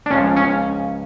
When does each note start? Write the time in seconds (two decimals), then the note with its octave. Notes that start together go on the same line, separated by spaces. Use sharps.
0.06 D4
0.11 C#2 C#3 F3 C#4
0.36 C#4